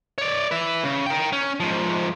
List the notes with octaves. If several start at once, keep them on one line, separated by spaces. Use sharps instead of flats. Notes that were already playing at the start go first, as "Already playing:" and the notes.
C#5 D5
B4 E5
C#3
A#4 G5
C#4
G#2 F3